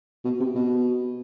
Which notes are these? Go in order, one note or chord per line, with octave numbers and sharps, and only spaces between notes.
B2
C3
B2